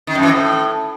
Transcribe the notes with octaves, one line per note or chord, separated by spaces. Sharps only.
D#3
F#2
E3
A2